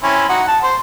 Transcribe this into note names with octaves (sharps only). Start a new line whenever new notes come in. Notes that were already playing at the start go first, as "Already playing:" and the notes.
C4 C#4 E4
D#4 F#4 F#5
A5
C5